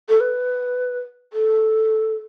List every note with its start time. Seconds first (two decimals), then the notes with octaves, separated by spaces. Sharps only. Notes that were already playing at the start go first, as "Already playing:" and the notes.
0.09 A4
0.20 B4
1.33 A4